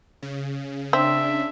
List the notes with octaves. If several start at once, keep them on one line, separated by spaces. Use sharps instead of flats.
C#3
C4 D4 E5